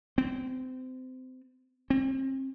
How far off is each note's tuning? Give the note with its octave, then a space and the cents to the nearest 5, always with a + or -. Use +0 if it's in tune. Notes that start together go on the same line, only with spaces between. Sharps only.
C4 -25
C4 +30